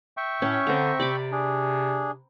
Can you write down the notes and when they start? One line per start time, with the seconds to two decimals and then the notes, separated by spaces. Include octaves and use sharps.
0.17 E5 G5 C#6
0.42 A2 C#4
0.67 D3 C4 A#5
1.00 C3 D5 B5 D6
1.32 D4 G#4